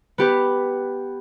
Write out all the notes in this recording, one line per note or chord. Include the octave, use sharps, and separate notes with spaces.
B3 G4 B4